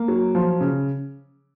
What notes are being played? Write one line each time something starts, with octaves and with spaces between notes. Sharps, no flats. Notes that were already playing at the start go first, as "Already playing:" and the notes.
Already playing: A#3
F#3
F3
C#3